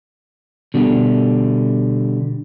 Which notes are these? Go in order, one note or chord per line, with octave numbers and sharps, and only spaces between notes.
B2 D3 G3